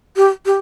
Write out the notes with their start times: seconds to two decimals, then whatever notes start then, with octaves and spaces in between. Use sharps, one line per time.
0.16 G4
0.46 G4